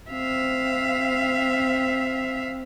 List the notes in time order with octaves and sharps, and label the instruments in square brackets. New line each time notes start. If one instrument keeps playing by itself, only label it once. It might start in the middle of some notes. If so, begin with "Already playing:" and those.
[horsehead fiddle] C4 [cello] E5 F5